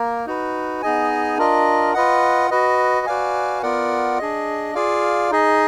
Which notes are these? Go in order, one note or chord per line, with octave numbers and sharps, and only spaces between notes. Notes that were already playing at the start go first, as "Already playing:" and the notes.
Already playing: A#3 A#4
D#4 F#4 B4
B3 D#4 G#4 D#5 G#5
D4 F4 A#4 D#5
F4 B4 D#5 F#5
F#4 B4 D#5
F#4 B4 D5 F5 G#5
B3 F4 A#4 D5 F#5
D4 G#4 D#5
F4 G#4 D5 F5
D#4 G#4 D#5